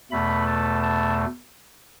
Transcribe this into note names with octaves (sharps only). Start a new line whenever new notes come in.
E2 B2 A3 B5
A5
A5